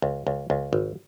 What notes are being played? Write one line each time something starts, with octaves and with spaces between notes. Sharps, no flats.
C#2
C#2
C#2
G#1